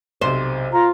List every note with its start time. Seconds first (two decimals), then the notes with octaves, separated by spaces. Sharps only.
0.21 B1 C3 C5
0.73 F4 A#5